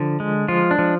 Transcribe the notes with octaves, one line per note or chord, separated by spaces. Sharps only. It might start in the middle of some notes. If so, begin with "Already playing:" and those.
Already playing: D3 F3
G#3
F3 F4
D4
F3